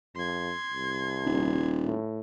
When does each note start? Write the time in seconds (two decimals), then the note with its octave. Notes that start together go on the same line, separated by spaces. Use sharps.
0.15 F2 C6 G#6
0.72 C2
1.25 D#1
1.84 A2